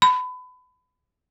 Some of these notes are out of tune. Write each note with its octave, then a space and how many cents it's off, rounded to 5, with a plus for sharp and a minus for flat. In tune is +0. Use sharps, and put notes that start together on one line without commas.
B5 +30